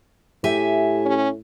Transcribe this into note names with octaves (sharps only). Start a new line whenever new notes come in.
A2 G4 E5 G#5
C#4